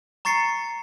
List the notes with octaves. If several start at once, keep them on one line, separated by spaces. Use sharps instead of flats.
A#5 C#6 A6 C7 C#7